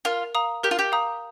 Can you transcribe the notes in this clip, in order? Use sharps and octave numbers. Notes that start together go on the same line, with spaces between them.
F4 A#4
F5 A#5 D#6
G4 A#4
F4
G4
F5 A#5 D#6